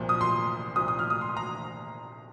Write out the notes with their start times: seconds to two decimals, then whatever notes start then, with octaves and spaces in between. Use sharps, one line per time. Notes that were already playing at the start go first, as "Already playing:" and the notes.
Already playing: C2 A#2 F3
0.09 D#6
0.21 C6
0.76 C2 A#2 F3 D#6
0.88 D#6
0.99 F6
1.10 D#6
1.21 C6
1.37 A#5